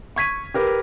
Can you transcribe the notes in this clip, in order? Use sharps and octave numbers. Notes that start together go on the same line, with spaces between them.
C#6 G#6 B6 D#7
G4 A#4 B4